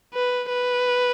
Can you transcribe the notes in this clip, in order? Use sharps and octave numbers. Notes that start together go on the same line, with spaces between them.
B4
B4